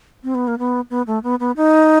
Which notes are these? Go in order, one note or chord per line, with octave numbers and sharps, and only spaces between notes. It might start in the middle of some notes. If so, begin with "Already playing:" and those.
C4
B3
A#3
B3
B3
A3
B3
B3
D#4